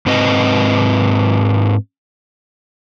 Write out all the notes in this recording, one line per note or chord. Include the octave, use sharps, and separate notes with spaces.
G#2 C4 B4 D#5